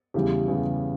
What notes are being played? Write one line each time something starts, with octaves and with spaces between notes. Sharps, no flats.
E2 C#3 E3 G3 G4
E2 C#3 E3 G3